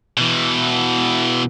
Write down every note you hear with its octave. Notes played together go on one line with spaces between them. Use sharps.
B2 E3